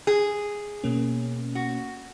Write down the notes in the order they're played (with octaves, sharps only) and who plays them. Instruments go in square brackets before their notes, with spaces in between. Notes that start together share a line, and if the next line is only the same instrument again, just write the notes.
[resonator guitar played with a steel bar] G#4
[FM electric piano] B2 A#3 C#4
[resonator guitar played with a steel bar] F#4